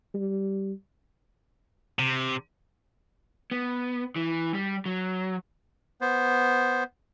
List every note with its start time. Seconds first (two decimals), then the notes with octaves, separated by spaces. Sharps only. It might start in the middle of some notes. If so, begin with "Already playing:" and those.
0.15 G3
1.99 C3
3.51 B3
4.16 E3
4.54 G3
4.86 F#3
6.01 B3 C5